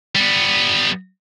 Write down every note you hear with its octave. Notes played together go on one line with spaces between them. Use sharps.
G3 B3